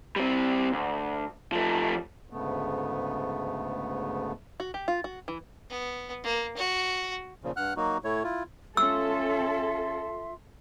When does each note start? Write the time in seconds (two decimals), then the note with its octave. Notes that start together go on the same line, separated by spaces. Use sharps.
0.16 G3 C4
0.73 D2
1.52 F3 A3
2.30 D2 G#2 C#3 A3 B3
4.60 F#4
4.74 G4
4.88 F4
5.04 F#4
5.28 E3
5.70 B3
6.23 A#3
6.57 F#4
7.44 A#2 C#3 F3
7.56 G2 F#5 F6 F#6
7.76 F#3 A#3 D#4 F#4
8.04 A2 A3 E4 C#5
8.24 E4 F4
8.77 C#4 F4 A4 E5 C6 E6